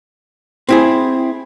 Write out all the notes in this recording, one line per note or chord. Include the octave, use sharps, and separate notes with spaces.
C4 E4 G#4